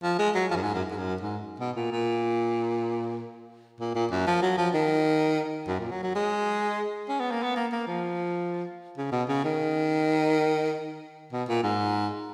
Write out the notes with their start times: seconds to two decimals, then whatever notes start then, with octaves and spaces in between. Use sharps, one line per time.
0.03 F3
0.19 G#3
0.35 F#3
0.50 F3
0.56 F#2
0.62 G#2
0.74 F#2
0.91 G#2
0.98 F#2
1.21 G#2
1.60 B2
1.76 A#2
1.92 A#2
3.80 A#2
3.95 A#2
4.11 F#2
4.27 F3
4.42 F#3
4.58 F3
4.74 D#3
5.67 F#2
5.80 A#2
5.91 F#3
6.03 F#3
6.15 G#3
7.09 C#4
7.20 B3
7.31 A#3
7.43 B3
7.56 A#3
7.72 A#3
7.87 F3
8.97 C#3
9.12 B2
9.29 C#3
9.44 D#3
11.32 B2
11.48 A#2
11.63 G#2